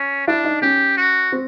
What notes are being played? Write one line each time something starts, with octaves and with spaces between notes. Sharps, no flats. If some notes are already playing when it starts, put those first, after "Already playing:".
Already playing: C#4
D4 E4
D#4
C#4 G4
F#4
C4